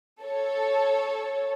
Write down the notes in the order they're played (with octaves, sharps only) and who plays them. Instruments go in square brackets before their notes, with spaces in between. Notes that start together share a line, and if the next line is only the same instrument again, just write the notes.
[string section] A4 C#5